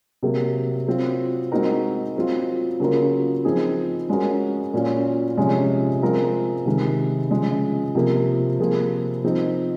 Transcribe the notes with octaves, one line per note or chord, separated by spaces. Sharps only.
C3 F#3 A#3
F#3 C4 F4
G#3 C4 D#4 F#4 A#4
F#3 C4 F4
C#3 F#3 A#3 F4 A#4
F3 C4 D#4 G#4
G#3 C#4 F#4 A#4
A#2 F#3 C#4 F4
C3 F3 G#3 C#4
F3 G#3 C4 F4 A#4
C3 D#3 G#3
C#3 F3 G#3
C3 F3 A#3
C3 F3 A#3 F4 G#4
F3 C4 D#4